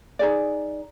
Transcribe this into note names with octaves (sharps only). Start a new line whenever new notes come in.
D#4 G#4 D5